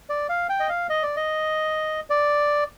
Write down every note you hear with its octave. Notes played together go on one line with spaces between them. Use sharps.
D5
F5
G5
D#5
F5
D#5
D5
D#5
D5